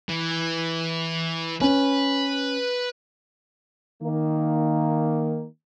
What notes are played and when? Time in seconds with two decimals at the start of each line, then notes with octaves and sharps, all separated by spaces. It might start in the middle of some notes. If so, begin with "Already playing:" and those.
0.09 E3
1.61 C#4 B4
4.02 D#3 A#3